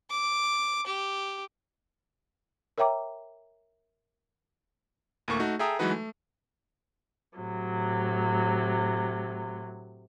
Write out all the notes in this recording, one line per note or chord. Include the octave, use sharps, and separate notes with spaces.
D6
G4
A#4 C#5 E5 G5 A#5 D6
D2 A2 A#3 C#6
A3 D#4 F#4
G#4 A4 E5 G5 A#5 D#6
E3 F#3 G#3 D#4 F#4 B4
A3
A2 C3 F#3